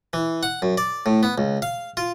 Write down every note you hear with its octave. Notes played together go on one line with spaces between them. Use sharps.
E3
F#5
F#2
D5
A2
B3
C#2
F5
F4